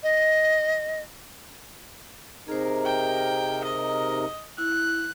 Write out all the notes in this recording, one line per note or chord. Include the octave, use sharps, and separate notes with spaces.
D#5
C3 D#4 G#4 A#4 C5
G5
D#5
E4 F#6